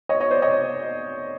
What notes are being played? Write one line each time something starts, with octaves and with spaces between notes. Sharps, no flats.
C#5 D#5
C#5 D#5
C5 D5
C#5 D#5